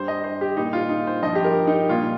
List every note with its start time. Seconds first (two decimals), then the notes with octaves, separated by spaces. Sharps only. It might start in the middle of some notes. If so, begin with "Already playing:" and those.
Already playing: G2 G3 C5
0.08 D#5
0.24 C5
0.41 G4
0.57 A#2 G3 D#4
0.73 F4
0.89 D#4
1.07 C5
1.22 G2 F3 D#5
1.35 G4
1.44 A#4
1.67 D#4
1.89 A#2 G3 F4